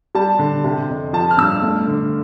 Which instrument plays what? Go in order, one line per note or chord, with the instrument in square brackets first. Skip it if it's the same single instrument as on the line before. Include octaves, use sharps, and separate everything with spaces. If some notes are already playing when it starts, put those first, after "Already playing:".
[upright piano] G3 A5
D3
C3
F2
F3 A5
F6
G2 E6
A3
D3